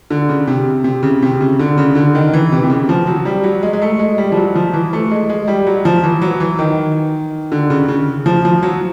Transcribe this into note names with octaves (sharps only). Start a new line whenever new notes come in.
D3
C#3
C3
C3
C#3
C3
C#3
D3
C#3
D3
D#3
E3
C3
C3
C#3
F3
F#3
G3
F#3
G#3
G#3
A3
G#3
G3
F3
F#3
F3
E3
A3
G#3
G#3
G3
F#3
F3
E3
F#3
E3
D#3
D3
C#3
C#3
F3
F3
F#3